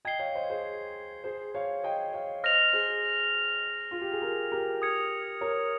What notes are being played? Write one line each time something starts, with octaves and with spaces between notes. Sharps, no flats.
D#5 G5 G#6 C7 G7
C#5 F5
C5 D#5
G#4 C5
G#4 C5
C#5 F5
D#5 G5
C#5 F5
C5 D#5 F6 A#6 F7
G#4 C5
F4
G4
G#4
G4 A#4
G4 A#4
D#6 G#6 C#7 F7
A#4 C#5